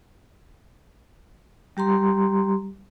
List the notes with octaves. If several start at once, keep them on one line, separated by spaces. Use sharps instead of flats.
G3 G4 A#5 C6